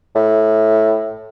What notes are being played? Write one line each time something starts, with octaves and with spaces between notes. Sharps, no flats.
A2